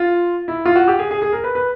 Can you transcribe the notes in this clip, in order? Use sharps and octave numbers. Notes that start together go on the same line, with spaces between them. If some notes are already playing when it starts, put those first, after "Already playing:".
Already playing: F4
E4
F4
F#4
G4
G#4
G#4
G#4
A#4
B4
B4